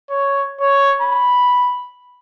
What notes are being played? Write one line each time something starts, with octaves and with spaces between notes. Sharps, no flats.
C#5
C#5
B5